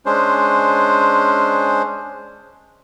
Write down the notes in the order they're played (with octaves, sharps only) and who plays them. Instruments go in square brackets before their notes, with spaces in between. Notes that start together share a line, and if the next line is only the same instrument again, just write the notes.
[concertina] G#3 C#4 D4 C5